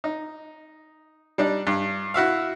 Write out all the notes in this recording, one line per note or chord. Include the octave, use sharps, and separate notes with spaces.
D#4
G3 D4 D#4
G2
E4 F#4 E5 F5